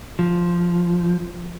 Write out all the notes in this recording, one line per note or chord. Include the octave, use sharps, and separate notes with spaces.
F3